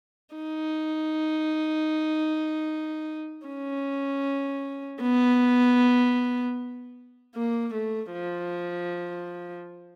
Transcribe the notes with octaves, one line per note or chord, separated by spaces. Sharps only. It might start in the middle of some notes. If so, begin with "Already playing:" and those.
D#4
C#4
B3
A#3
A3
F3